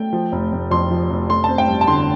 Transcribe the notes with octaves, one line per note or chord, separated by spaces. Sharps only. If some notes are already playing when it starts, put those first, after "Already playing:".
Already playing: A3 G5
F3
F1
F1
F2 C6
F3
F1
A3 C6
C4 A5
G5
G2
A5
D3 C6